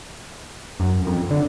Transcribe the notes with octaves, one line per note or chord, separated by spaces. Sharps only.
F#2
F2
D3